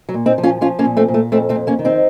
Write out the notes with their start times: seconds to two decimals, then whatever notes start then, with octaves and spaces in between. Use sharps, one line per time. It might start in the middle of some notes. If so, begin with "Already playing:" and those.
0.09 F#3
0.14 A#2
0.26 C4 D#4
0.38 F3
0.43 C#4 F4
0.61 F3 C#4 F4
0.79 A#3 C#4
0.85 A#2
0.97 A3 C4
1.08 A#2
1.14 A3
1.32 F2 A3 C4
1.49 A3 C4
1.55 F2
1.67 A#3 C#4
1.79 D#3
1.85 C4 D#4